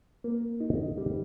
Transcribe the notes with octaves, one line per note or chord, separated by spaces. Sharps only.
A#3
D#4
G3